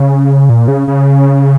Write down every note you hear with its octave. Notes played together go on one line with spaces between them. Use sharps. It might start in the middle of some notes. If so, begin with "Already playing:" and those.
Already playing: C#3
A#2
C#3
C#3